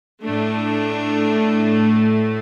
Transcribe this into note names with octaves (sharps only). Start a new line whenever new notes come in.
A2 A3 D4